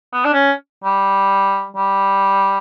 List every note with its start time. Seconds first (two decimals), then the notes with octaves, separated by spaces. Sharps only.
0.13 B3
0.25 D4
0.33 C#4
0.84 G3
1.76 G3